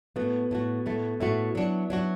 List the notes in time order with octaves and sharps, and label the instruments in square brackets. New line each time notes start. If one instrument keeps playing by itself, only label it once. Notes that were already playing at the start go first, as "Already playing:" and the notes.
[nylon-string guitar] A2 A3 F#4 [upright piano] B3
[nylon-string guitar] A2 A3 F#4
A2 A3 F#4
[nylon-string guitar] A2 A3 F#4 [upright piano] E4
[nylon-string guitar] F#3 D4 F#4
F#3 D4 F#4